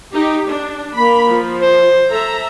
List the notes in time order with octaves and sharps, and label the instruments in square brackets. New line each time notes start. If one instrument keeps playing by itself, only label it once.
[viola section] D#4 G4
D4
[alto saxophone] A#3 [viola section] B5
[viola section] F3
[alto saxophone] C5
[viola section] A4 E5 A#5